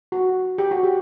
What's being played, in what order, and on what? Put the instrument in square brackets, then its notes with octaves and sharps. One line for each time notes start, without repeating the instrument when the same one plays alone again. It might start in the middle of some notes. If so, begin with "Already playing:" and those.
[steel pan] F#4
G4
F#4
G4